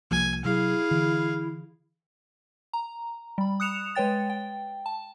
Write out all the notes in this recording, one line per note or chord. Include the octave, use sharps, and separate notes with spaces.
C2 F3 A#3 G#5
C3 F#3 E4 G#4 F5
D3 E3
A#5
G3 B5
D#6 F#6 C#7 E7 F7
G#3 B4 C#5 G5 A6
G5
A5